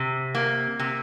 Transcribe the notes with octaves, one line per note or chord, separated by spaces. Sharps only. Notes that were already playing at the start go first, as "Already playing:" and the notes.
Already playing: C3
A#3
C3